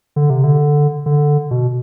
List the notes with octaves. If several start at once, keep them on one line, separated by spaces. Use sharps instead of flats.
D3
C3
D3
D3
B2